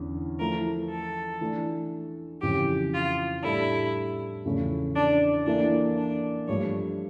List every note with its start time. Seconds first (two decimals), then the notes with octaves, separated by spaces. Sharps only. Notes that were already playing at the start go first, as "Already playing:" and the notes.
Already playing: E2 D3 C#4
0.39 F3 A3 E4 A#4
0.90 A4
1.41 E3 A3 D4
2.42 F2 C#3 E3 G4
2.93 F4
3.44 A2 G3 D4 E4 A4
4.45 E2 C#3 F3 A3 C#4
4.95 D4
5.46 E3 A#3 D4 E4 A4 E5
5.98 D4
6.48 G2 F3 A3 C#5